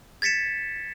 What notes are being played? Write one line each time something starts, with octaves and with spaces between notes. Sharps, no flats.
G#6 A6 B6 C#7 E7